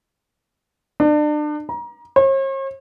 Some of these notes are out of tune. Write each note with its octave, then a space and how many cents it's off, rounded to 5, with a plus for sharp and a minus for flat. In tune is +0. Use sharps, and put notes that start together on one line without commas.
D4 +35
A#5 +30
C#5 -45